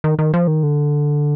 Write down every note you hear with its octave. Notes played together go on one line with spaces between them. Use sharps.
D#3
D#3
F3
D#3
D3